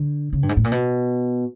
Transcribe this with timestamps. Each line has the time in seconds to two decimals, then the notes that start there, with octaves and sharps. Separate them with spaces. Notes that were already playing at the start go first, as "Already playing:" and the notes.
Already playing: D3
0.33 C#3
0.43 G2
0.49 G#2
0.57 A2
0.64 A#2
0.72 B2